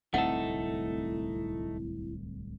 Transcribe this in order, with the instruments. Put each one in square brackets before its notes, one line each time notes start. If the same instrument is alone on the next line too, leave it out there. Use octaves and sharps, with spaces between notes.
[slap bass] D1 C2 C4 [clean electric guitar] A3 D#4 A4 [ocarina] E4 [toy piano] F#5